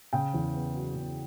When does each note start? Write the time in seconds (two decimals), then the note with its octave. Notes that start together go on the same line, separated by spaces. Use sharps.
0.13 C#3 G5
0.34 E2
0.55 B3
0.75 F#3
0.95 C#3